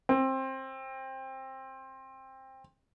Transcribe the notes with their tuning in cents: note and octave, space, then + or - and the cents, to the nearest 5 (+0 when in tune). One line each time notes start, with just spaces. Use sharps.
C4 +20